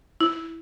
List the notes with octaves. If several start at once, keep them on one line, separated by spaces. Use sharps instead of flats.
E4